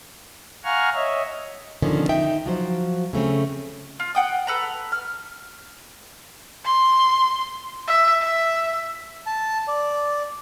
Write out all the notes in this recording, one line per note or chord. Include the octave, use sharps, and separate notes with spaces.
F5 F#5 G#5 A#5 C#6 F6
C#5 D#5 E5
B2 D3 D#3 F3 C#4
D#4 E5 G5
F3 F#3 C5
C#3 A3 C4 C#4
F4
F#5 G5 D#6
A4 B4 A#5
F6
C6
E5
E5
A5
D5